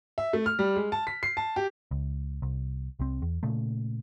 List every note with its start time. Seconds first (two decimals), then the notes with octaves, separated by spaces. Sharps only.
0.18 E5
0.33 A3
0.46 F6
0.59 G3
0.76 G#3
0.92 A5
1.07 B6
1.23 C7
1.37 A5
1.56 G4
1.91 C#2
2.42 C2
2.99 C2 C4
3.22 E2
3.43 A#2 C#3 A3